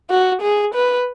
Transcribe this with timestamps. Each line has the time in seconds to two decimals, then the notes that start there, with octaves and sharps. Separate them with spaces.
0.10 F#4
0.42 G#4
0.74 B4